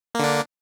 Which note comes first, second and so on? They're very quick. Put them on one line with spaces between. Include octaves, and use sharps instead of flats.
A#3 D3 D4